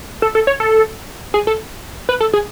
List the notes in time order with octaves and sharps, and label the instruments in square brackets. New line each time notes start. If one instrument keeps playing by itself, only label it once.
[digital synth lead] A4
A4
C#5
A4
G#4
A4
B4
A4
G#4